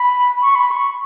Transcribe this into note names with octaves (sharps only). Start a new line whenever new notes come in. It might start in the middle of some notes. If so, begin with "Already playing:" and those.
Already playing: B5
C#6
B5
C#6